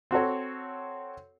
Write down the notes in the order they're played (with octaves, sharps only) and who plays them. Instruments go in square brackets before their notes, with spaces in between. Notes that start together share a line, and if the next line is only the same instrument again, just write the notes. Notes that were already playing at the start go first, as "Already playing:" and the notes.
[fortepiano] C4 F#4 A4 C#5